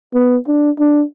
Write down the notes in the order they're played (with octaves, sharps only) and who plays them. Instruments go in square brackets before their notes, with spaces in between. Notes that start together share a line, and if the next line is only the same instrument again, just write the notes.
[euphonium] B3
D4
D4